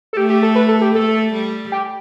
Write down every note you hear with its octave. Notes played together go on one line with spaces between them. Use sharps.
A4
A3 G4
G4
A4
B4
A4
G4
A3 A4
G3
G4